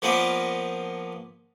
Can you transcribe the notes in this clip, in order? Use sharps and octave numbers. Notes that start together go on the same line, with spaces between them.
F3 A#3 B3 C#4 D4